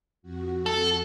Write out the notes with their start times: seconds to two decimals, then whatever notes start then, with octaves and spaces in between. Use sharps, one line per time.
0.22 F2 F#4
0.66 A4